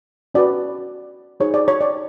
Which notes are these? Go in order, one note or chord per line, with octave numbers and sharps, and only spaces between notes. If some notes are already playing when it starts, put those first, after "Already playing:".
C#4 F#4 B4 D5
D#4 G#4 C5 C#5
D5
C#5
D5